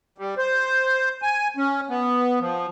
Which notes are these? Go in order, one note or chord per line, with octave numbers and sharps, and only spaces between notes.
G3
C5
G#5
C#4
B3
F3